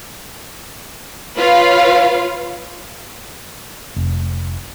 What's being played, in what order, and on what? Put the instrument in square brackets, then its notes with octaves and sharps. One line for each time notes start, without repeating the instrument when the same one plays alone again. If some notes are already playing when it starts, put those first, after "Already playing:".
[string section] F4 B4 C#5 F5
[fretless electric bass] F1